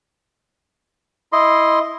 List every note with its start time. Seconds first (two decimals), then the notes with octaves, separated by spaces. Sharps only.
1.33 E4 D#5 C6